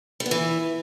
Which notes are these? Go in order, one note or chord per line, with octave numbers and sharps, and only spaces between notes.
G3
B3
E3